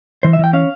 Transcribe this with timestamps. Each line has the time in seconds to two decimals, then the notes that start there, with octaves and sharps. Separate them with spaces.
0.23 E3 C5
0.33 E5
0.39 E3 G5
0.53 C#4 F5